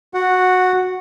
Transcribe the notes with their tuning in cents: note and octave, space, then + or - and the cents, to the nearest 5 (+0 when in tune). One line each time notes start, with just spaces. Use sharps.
F#4 -15 F#5 +0